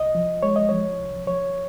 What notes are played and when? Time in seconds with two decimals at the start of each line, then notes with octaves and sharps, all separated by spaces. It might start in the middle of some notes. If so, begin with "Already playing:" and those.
Already playing: C2 D#5
0.15 F3
0.43 G#3 C#5
0.56 D#5
0.69 F3 C#5
1.00 C2
1.27 F3 C#5